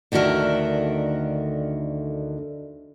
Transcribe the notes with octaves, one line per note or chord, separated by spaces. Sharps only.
D2 D3 D#3 F#4 A#4 E5